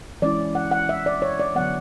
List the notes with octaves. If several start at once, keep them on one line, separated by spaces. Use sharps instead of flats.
E3 G#3 C#4 E4 D5
F#5
F#5
E5
D5
C#5
D5
D3 F#3 B3 F#5